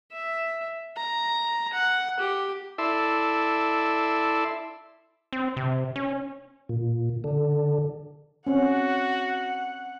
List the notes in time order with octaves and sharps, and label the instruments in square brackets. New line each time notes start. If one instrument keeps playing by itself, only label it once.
[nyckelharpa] E5
A#5
F#5
G4
[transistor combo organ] E4 A4 D5 E5 C6
[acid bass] C4
C3
C#4
[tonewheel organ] A#2
D3
[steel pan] C4 C#4 [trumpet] F#4 [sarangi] F#5